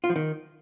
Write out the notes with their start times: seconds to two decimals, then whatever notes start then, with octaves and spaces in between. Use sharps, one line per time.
0.04 F4
0.10 F3
0.16 D#3